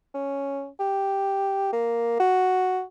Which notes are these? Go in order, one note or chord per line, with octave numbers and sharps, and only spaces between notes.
C#4
G4
A#3
F#4